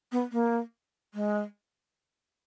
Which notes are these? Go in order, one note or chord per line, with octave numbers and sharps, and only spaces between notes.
B3
A#3
G#3